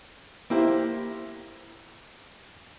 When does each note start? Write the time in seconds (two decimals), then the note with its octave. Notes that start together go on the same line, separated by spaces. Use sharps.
0.50 A#3 E4 G4 C5